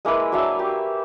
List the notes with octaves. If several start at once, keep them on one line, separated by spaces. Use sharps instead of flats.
G#3 A#3 E4 B4
F#3 D4 E5 F5
G4 C#6